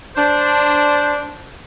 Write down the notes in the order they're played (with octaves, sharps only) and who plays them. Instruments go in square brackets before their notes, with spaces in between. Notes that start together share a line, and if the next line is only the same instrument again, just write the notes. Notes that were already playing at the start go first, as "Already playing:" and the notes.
[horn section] D4 C5